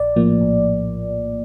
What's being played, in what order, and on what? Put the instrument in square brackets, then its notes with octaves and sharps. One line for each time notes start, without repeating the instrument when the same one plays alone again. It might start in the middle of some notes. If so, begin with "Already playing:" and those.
Already playing: [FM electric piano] A#1 D5
A2 F3 A#3
A#1